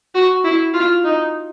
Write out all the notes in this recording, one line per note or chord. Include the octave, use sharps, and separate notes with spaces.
F#4
E4
F4
D#4